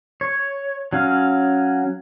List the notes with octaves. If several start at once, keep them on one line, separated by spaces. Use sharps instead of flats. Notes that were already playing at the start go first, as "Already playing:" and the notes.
C#5
F#3 C#4 F5